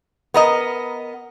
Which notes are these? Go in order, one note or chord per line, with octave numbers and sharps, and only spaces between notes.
B3 A#4 D#5